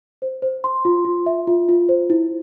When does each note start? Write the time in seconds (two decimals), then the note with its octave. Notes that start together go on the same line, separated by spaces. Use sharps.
0.22 C5
0.42 C5
0.64 C6
0.85 F4
1.05 F4
1.26 E5
1.47 F4
1.69 F4
1.89 C5
2.10 E4